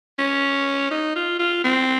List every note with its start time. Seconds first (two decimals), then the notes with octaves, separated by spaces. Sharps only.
0.19 C#4
0.91 D#4
1.16 F4
1.39 F4
1.64 C4